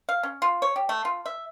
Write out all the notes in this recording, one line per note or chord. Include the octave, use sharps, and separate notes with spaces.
F5
C#4
F4
C#5
G4
A3
F4
E5